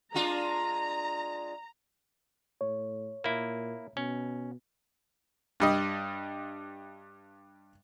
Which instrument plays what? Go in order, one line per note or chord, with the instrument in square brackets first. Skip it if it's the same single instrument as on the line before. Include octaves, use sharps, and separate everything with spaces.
[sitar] G#3 D4 F4 [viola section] A#5
[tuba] A2 [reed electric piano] C#5
[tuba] A#2 [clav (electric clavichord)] A#3 E4
[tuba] B2 [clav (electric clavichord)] C#4
[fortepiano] G2 G3 D#5